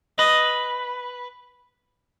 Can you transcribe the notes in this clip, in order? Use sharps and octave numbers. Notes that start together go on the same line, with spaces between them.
B4 D#5